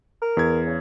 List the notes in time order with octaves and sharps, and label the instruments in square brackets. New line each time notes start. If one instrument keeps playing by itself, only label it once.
[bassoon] A#4
[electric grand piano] E2 G#6
[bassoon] C#3